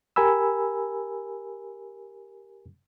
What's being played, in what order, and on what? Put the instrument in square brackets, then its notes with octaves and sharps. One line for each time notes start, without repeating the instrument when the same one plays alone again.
[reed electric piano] G4 A#4 G#5 B5 E6